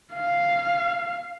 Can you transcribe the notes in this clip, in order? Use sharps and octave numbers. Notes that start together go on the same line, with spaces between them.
F5